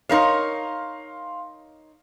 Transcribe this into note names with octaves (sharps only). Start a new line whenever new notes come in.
D#4 A#4 C#5 F5 C6